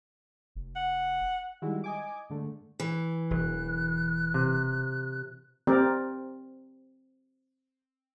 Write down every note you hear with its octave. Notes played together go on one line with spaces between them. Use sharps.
F1
F#5
D#3 G3 G#3 E4 F#4
D#5 G#5 D6
G#2 D3 A3
E3
E1 F#3 F#6
C3
C4 G4 A#4 D5